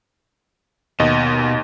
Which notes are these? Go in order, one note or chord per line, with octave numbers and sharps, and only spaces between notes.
D#2 B2 D#5